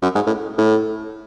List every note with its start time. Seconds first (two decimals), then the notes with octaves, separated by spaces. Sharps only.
0.02 F#2
0.15 G#2
0.27 A2
0.58 A2